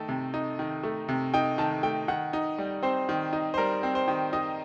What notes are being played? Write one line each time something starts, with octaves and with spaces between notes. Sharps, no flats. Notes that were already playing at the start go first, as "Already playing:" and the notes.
Already playing: D#3 A3 A4
C3
D#4
D#3
A3
C3
D#4 G5
D#3 A5
A3 G5
D#3 F#5
D#4
G3
C4 C5
D#3
D#4
C5
G3 A#4
C4
C5
D#3
D#4 D#5